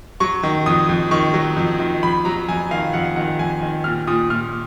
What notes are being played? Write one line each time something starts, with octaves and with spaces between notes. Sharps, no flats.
F#3 C#6
D#3
F2 D#6
F2
D#3 C#6
F#3
F2
D#3
F2 B5
F#3 A#5
F2 G#5
D#3 F5
F2 F#5
D#3 F#5
F2 G#5
D#3
A#2 F6
A#2 D#6
A#2 F6